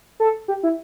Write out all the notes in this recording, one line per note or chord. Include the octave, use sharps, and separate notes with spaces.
A4
G4
E4